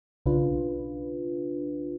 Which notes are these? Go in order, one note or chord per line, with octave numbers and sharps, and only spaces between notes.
B1 C#3 D4 F4 B4